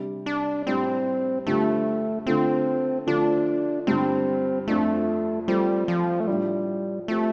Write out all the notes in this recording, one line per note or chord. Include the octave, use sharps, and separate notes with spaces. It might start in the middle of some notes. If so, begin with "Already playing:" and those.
Already playing: C3 G3 D4 G4
D4
A2 G3 C4 D4 G4
G2 D3 G3 A3 F4
D3 A3 C4 F4
D3 F3 A3 D4 F4
G2 D3 G3 C4
F2 F3 A3 D4 F4
F3 G3 A3 C4
F3
A3
A2 F3 G3 D4 G4
F3 A3 C4 G4